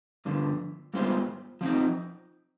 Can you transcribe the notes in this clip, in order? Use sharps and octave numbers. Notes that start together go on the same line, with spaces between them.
G2 D3 F3 B3
G#2 G3 B3 F4 C5
F3 C4 D#4